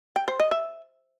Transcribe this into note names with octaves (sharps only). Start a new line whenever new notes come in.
G5
C5
D#5
E5